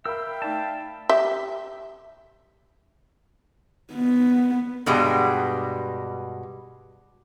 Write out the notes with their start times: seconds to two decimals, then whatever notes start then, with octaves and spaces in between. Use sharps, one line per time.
0.06 A#4 E5 F5 G5 B5 E6
0.42 A3 D#4 D5 A5
1.09 G4 E5
3.94 B3
4.86 G2 B2 G3 G#3